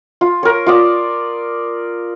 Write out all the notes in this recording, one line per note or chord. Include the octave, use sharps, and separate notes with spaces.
F4
A#4 C#5
F4 D5 D#6